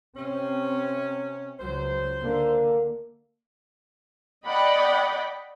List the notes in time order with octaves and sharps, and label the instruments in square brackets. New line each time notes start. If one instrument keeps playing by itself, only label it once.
[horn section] C3 C#4 [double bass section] C4
[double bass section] C#2 F#3 [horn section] C5
[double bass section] D3 [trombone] A#3
[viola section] D5 D#5 F#5 G5 B5